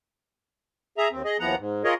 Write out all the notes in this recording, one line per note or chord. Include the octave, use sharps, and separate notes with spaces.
G#4 E5 A#5
D#2 C4
G#4 D#5
D#2 E3 F3 B3 F#5 A#5
G#2
F4 G#4 A#4 C#5 D#5